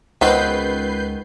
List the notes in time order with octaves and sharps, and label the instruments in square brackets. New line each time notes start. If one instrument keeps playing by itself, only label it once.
[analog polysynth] C#2 [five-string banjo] D#3 B3 C4 [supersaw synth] B4 G6 C7